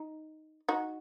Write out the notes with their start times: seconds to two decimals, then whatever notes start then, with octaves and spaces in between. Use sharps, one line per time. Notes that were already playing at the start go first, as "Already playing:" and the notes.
Already playing: D#4
0.69 D#4 F#4